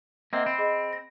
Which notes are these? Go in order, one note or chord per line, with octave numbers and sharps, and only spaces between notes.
A#3 C4 D#5 E5 F#5
C4 B5
G#4 D#5 B5
A#6